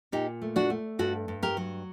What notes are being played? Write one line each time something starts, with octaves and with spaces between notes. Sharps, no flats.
A#2 D#4 G4
A3
D4 F#4
A3
G2 F#4 A4
G2
G4 A#4
F#3